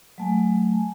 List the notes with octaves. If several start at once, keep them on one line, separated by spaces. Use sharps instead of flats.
F#3 A3 G#5